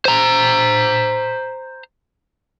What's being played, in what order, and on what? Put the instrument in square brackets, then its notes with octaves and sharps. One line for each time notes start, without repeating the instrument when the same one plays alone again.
[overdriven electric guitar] C5 A#5